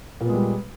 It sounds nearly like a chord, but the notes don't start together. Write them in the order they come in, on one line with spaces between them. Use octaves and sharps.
A#2 B3 G#3 G3